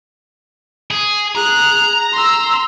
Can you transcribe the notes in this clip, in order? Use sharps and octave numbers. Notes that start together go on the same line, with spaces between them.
G#4
G#4 A#5 F#6
C6 E6